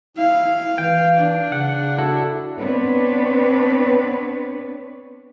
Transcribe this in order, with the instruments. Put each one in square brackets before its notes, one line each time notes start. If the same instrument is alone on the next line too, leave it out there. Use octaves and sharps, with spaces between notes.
[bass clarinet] E4 [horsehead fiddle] F5
[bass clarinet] E3 [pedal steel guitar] G5
[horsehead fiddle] D4
[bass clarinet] C#3 [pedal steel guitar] F#5
[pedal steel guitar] E4 F#4 A4
[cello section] B3 C4 D4 B4 C#5